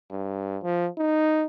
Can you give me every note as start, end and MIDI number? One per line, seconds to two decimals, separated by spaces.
0.11 0.58 43
0.63 0.88 53
0.98 1.46 63